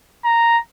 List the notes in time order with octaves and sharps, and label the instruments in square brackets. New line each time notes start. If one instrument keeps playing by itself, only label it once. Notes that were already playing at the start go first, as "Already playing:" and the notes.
[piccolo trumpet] A#5